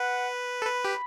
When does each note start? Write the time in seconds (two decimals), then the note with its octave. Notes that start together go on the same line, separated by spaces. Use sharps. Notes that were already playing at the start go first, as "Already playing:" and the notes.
Already playing: B4 F#5
0.62 A4
0.66 B4 B5
0.84 G4